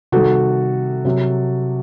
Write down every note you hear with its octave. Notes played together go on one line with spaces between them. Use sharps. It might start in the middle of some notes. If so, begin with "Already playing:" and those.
C3 D#3 G3 F#4 A4
C3 F#3 C4